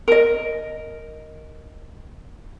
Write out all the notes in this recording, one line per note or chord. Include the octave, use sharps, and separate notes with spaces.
A#4 D#5